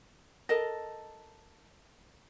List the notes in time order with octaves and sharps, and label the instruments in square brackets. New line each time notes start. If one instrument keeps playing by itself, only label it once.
[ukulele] A4 A#4 D#5